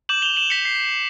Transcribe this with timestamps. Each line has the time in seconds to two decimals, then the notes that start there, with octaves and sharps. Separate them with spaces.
0.09 D6 G6 E7 F#7
0.22 F7 G7
0.36 E7 F#7
0.50 B6 C#7
0.65 C7